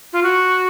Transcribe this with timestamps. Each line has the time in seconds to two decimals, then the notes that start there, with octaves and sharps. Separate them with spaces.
0.13 F4
0.23 F#4